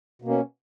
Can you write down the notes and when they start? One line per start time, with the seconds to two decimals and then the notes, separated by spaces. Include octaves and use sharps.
0.22 B2
0.25 A#3
0.28 C#4